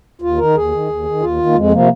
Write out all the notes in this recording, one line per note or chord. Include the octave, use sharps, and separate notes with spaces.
D#2 F4
D#3 A#4
D#2 G#4
D#3
D#2
D#3
D#2 F4
D#3
A#3
F2 G#3
C3 F3 A#3